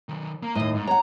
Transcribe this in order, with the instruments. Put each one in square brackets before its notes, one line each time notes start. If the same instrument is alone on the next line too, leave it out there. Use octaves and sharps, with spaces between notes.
[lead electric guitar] D#3 F#3
A#3
[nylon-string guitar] D#2 A2 [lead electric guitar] D#5
[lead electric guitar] G#2
[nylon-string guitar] C#5 F#5 [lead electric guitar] A#5